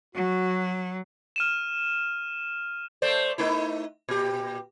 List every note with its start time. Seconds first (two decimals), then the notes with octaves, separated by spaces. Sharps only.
0.15 F#3 F#4
1.36 F6 D#7 E7
3.02 A3 C5 D5
3.38 A3 D#4 E4
4.09 A#2 G4